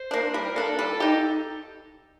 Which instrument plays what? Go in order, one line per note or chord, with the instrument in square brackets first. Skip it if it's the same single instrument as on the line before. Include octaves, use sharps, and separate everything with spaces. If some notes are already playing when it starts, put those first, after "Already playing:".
Already playing: [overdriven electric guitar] C5
[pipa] A#3 D4
[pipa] G3 [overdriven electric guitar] A#4
[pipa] A#3 D4 [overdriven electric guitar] A4
[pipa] G3
D#4 G4